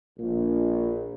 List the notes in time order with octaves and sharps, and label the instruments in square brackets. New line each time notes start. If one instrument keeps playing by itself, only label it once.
[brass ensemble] A#1 [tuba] A#2